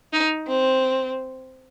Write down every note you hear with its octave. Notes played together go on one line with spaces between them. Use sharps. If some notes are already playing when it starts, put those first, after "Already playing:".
D#4
C4